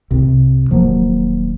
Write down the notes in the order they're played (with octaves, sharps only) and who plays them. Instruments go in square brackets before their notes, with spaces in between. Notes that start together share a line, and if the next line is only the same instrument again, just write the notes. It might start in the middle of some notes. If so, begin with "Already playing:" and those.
[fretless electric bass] C2 C3
D#1 F3 F#3 A#3